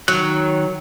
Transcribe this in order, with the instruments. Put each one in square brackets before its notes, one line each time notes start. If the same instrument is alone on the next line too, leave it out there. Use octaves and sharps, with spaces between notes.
[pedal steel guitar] D#3 F#6 [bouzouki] F#3